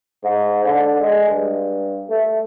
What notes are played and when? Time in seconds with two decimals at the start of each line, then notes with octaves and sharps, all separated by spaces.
0.24 G#2
0.65 D3
1.00 G#3
1.28 G2
2.09 A3